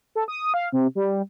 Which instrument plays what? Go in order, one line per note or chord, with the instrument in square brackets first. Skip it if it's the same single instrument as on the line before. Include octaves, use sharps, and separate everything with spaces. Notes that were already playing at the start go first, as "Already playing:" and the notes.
[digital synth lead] A4
D#6
F5
C3
G3